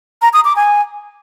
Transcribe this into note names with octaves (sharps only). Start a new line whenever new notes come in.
A#5
D#6
D6
G#5